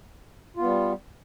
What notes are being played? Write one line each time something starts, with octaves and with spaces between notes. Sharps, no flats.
G3 B3 F4